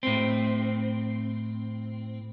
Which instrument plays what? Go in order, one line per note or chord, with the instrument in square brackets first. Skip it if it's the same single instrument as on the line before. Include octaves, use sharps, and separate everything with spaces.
[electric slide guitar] A2 C4